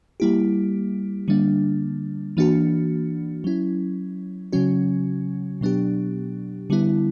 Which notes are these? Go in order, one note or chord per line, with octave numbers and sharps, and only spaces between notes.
G3 A#3 E4 G4
D3 G3 A#3 D4
E3 A#3 D4 F#4
F#3 C#4 E4
C#3 F#3 C#4 F#4
B2 F#3 B3 D4 G4
D3 G3 B3 E4